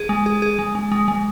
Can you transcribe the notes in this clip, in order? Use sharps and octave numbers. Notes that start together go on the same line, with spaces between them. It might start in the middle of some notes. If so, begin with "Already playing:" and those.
Already playing: G#4
G#3
G#4
G#4
G#3
G#3
G#3
G#3